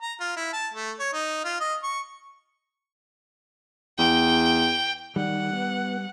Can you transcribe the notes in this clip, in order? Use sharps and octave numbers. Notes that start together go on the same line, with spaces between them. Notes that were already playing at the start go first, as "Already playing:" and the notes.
A#5
F4
E4
A5
A3
C#5
D#4
F4
D#5
C#6
E2 G5
D#3 G3 F#5
B3